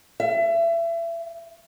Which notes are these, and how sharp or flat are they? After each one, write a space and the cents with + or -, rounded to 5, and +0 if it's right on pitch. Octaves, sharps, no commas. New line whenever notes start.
E5 +30